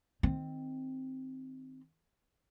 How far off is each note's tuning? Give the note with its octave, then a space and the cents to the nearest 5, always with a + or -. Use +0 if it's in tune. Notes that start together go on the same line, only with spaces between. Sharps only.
D#3 +0 C4 +0